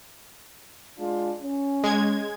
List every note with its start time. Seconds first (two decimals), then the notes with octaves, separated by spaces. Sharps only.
0.98 G#3 D4 F4
1.41 C#4
1.84 G#3 G#6